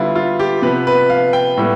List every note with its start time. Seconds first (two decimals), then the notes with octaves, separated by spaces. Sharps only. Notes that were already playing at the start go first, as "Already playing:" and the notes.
Already playing: D3 G3 B3 E4 F4
0.16 F4
0.40 G4
0.62 C3 F3 B3 B4
0.87 B4
1.10 F5
1.33 G5
1.57 A2 G3 B3